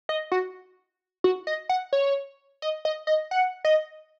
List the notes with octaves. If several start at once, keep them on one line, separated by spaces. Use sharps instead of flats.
D#5
F#4
F#4
D#5
F#5
C#5
D#5
D#5
D#5
F#5
D#5